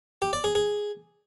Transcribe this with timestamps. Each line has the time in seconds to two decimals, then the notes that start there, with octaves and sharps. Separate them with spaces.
0.22 G4
0.33 D5
0.44 G#4
0.55 G#4